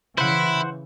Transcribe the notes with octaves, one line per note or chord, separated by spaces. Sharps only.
C#3 E3 E4 C5 F#5